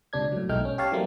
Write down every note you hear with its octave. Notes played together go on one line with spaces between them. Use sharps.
C#2 C3 D4 G#6
A2 F#3
B1 G#2 A3 D#4 G5 F6
C#4
G4 C#5 F5 A5
E3 F#3 G3 A3 A#3 C4